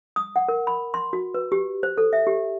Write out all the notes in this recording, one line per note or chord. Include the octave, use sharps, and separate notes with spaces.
D#6
F#5
A#4
B5
C6
F#4
B4
G4
C5
A4
E5
G4